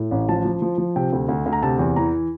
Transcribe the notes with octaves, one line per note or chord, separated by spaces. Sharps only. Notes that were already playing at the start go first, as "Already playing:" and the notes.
Already playing: A2
A1
F3 A5
F3
F3
F3
C3 G5
D2
D2
D2
A#5
C3 A5
E2
E3 A#5